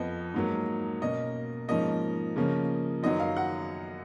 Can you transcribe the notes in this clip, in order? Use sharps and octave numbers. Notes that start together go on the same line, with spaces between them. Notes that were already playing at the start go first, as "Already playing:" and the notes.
Already playing: F2 F3 B3 D#5
G#2 F#3 A#3
B2 A#3 C#4 D#5
G#2 F3 A#3 C#4 D#5
C#3 F3 A#3 C#4
F#2 D#3 F#3 B3 D#5
F5
F#5